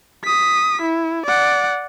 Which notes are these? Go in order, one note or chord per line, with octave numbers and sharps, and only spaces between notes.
D#6 B6
E4
D5 F#5